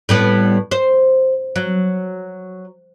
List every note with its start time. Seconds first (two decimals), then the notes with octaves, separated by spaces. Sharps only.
0.09 A2 G3 B3
0.71 C5
1.56 F#3